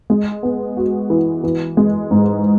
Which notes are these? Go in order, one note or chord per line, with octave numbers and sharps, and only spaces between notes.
G#3
B3
F#4
E3
E3
G#3
G#2